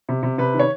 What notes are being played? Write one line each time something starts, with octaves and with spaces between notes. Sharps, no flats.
C3
C3
C3 B4
D#3
C#5